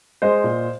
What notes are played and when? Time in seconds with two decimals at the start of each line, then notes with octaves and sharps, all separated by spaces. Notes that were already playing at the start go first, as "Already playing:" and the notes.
0.22 G#3 C5 D#5
0.44 A#2